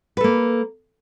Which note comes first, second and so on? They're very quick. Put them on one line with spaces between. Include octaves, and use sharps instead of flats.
B4 A4 A#3